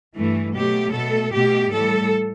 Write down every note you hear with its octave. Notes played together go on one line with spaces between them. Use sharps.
G2 E3 A3
B2 F#3 A3 G4
B2 A3 A4
B2 A3 G4
A2 E3 G3 A4